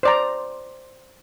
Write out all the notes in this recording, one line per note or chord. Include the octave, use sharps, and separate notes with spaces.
C5 D5 A#5